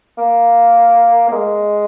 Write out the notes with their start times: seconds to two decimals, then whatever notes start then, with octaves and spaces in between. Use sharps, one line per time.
0.18 A#3
1.28 A#3
1.32 G#3